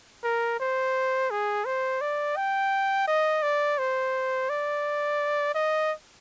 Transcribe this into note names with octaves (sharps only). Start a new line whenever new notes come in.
A#4
C5
G#4
C5
D5
G5
D#5
D5
C5
D5
D#5